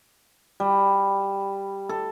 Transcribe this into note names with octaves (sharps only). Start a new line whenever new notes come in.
G3
A4